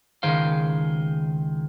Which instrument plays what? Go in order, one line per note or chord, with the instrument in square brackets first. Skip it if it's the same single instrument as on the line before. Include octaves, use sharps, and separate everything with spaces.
[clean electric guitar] C#2 D#3 G#4 C5 F5